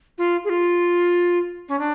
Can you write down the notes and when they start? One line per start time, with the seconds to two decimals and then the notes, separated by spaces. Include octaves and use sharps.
0.18 F4
0.44 G#4
0.49 F4
1.68 C#4
1.79 D4